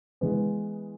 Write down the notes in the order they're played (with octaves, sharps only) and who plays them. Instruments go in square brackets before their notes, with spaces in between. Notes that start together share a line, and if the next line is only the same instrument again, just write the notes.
[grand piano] E3 G#3 B3